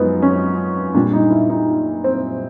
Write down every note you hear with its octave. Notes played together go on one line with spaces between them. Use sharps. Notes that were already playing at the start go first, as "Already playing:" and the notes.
Already playing: F#2 F3 G#3 B3 D#4
C#4
A#2 G3 D4
D#4
E4
D#4
C4